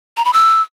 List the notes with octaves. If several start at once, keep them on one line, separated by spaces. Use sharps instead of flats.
A#5
B5
E6